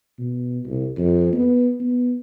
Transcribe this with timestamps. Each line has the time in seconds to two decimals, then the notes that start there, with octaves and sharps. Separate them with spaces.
0.18 B2
0.66 C2
0.98 F2
1.33 B3
1.80 B3